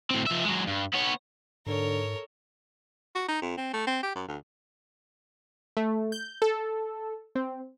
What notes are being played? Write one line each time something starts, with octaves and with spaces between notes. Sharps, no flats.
A2 C4
F3 E5
F#3 G#3
G2
B3 C#5
G#2 D3 A4 A#4 C#5
F#4
D#4
F2
C4
A3
C4
G4
F#2
D2
A3
G6
A4
C4